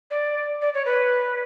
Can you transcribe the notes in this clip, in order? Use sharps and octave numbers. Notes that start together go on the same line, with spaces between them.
D5
D5
C#5
B4